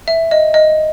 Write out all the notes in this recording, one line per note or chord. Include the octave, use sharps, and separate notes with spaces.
E5
D#5
D#5